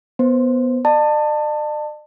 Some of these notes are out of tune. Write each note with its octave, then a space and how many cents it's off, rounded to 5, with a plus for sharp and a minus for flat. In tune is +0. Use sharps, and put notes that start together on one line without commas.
B3 +0 C5 +0
D5 +45 A5 +20